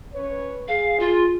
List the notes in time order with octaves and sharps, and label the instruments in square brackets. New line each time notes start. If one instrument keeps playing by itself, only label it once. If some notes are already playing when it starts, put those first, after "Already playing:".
[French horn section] C#4 B4 C#5
[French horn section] G#4 [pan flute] F5
[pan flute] F4